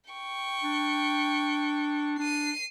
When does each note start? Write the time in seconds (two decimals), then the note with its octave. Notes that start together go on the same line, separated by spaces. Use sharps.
0.10 G5 C#6
0.63 D4
2.19 D4 C7 D#7